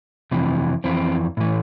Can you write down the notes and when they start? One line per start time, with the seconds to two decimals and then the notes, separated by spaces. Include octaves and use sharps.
0.31 F2 C3 E3
0.84 F2 E3 C4
1.37 A2 E3